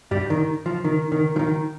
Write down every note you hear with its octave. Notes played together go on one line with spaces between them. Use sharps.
G2 G3
D#3
F3
D#3
D#3
F3
D#3